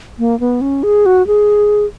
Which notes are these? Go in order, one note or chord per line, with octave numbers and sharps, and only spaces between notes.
A#3
B3
C#4
G#4
F#4
G#4